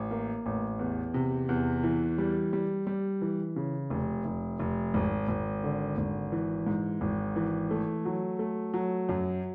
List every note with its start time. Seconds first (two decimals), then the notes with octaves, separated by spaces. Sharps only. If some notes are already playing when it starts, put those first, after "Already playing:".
Already playing: A1
0.11 A#3
0.46 A1
0.79 E2
1.14 C3
1.49 E2
1.83 E3
2.18 G3
2.53 G3
2.87 G3
3.22 E3
3.56 C#3
3.90 F1
4.25 F1
4.59 F1
4.94 G#1
5.28 G#1
5.63 D3
5.98 G#1
6.32 E3
6.67 G#2
7.01 G#1
7.36 E3
7.71 A3
8.05 F#3
8.39 A3
8.74 F#3
9.09 F#2